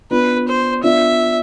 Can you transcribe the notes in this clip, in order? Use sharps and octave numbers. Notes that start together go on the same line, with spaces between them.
B3 D4 F4 B4
C5
B3 D4 F4 E5